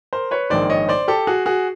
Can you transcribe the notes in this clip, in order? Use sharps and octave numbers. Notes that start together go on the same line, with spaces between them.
A#4 C5
B4 C#5
A#1 G#2 D#3 C5 D5
C#5 D#5
C5 D5
G4 A4
F#4 G#4
F#4 G#4